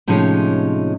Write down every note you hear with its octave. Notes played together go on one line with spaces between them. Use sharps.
A2 C3 F3 G#3 C#4 D#4